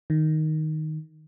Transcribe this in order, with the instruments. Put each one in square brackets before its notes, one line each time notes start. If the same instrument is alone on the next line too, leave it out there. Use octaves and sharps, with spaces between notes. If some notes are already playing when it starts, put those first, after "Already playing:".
[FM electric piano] D#3